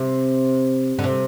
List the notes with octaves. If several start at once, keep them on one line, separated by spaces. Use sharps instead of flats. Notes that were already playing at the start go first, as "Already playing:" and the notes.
Already playing: C3
D3
C3